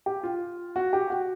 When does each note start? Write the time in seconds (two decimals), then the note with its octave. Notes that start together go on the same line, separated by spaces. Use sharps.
0.06 G4
0.23 F4
0.76 F#4
0.93 G4
1.10 F#4